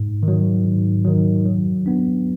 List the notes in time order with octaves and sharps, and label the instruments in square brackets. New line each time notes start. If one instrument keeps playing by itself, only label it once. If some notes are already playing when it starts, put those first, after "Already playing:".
Already playing: [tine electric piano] G#2
D#3
F#3
G#2
D#3 F#3
F#3
B3 D4